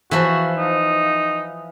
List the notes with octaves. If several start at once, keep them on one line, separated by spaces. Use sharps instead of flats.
E3 F3 F#4
D#4